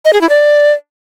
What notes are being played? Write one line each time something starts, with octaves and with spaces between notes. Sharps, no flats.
D#5
G#4
E4
D5